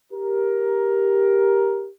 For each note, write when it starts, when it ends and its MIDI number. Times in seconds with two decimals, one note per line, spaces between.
0.12 1.90 67
0.12 1.90 70